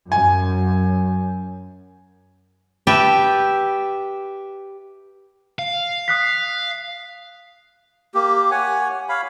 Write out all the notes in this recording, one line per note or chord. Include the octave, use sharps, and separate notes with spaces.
F#2 G#5
G4 B4 E5 G5 A5
F5
D#6 F#6 B6
A#3 G4
C#5 F#5 G#5
C#5 F5 B5